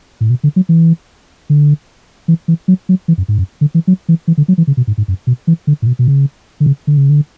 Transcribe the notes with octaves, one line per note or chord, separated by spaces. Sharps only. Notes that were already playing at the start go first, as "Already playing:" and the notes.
A2
B2
D3
F#3
E3
D3
E3
E3
F#3
F#3
E3
F#2
G#2
F#2
D3
E3
F#3
E3
E3
D3
F#3
E3
C#3
B2
G#2
G#2
F#2
B2
E3
D3
A2
B2
B2
C#3
D3
C#3
D3
C#3
D3